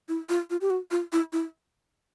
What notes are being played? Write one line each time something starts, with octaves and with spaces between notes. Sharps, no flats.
E4
F4
F4
G4
F#4
F4
E4
E4